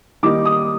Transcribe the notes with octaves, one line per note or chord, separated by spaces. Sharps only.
D#3 G3 A#3 D#4 D6
D#6